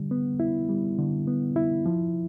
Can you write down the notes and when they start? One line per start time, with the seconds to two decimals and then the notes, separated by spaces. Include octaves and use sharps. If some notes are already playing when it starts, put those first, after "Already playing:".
Already playing: D3 G3
0.11 B3
0.40 E4
0.69 G3
0.99 D3
1.28 B3
1.56 E4
1.86 F3